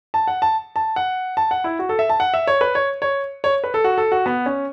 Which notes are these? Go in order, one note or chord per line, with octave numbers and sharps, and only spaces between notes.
A5
F#5
A5
A5
F#5
A5
F#5
E4
F#4
A4
E5
A5
F#5
E5
C#5
B4
C#5
C#5
C#5
B4
A4
F#4
A4
F#4
B3
C#4